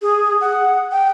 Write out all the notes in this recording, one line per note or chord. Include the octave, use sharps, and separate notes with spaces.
G#4
F#5
G5